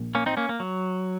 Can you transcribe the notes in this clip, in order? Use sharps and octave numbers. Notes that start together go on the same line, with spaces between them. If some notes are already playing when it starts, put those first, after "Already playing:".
Already playing: A#1 A#2
A#3 C#4
C4 D#4
A#3 C#4
A#3
F#3